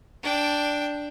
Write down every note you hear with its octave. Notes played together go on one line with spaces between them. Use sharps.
D4 G5